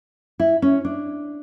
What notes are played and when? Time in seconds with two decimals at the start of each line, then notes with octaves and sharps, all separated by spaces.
0.40 E4
0.62 C#4
0.85 D4